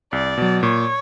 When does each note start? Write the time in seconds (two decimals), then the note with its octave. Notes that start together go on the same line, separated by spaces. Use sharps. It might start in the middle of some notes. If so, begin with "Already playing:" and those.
0.13 C2 D5
0.38 B2 F#3
0.63 A#2 C#5